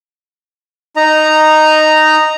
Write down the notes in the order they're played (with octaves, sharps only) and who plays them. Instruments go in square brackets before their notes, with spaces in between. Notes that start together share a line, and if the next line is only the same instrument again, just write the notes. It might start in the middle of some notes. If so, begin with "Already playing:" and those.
[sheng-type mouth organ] D#4 D#5 A#5